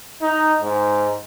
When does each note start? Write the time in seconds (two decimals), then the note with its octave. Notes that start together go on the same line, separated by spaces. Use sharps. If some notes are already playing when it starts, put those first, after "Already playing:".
0.21 D#4
0.62 G#2